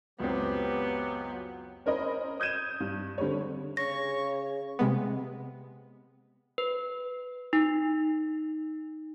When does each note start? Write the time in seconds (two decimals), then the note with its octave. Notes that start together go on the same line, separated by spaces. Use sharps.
0.20 C#2 F#2 F#3 B3 C4 G4
1.86 C#4 A#4 C5 D#5 B5
2.40 D#6 G6 G#6 D#7 E7
2.80 G2
3.18 D3 G3 C4 C#5
3.77 C#3 C#5 C#6 A#6
4.79 C3 G#3 B3
6.58 B4
7.53 D#4